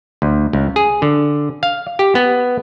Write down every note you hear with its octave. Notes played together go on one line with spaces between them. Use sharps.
D2
C#2
G#4
D3
F5
G4
B3